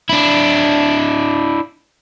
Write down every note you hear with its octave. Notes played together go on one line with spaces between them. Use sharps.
D4 E4